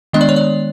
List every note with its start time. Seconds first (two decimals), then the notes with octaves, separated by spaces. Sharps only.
0.13 D#3 G#3 B3 D4 D#5
0.21 D5
0.29 C#5
0.36 D5